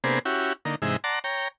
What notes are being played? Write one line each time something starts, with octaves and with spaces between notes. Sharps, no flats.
C3 A#3 B3 D4 G#4 C5
C#4 E4 F#4 G4
D3 A#3 D#4
G#2 C3 E3 G#3 D#4 E6
D5 F#5 A5 A#5 C6 D6
C#5 G5 A#5